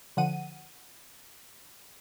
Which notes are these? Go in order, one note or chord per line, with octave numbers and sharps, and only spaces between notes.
D3 F3 F#5 D#7